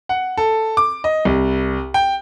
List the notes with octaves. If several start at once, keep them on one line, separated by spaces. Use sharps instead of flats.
F#5
A4
D6
D#5
C2
G5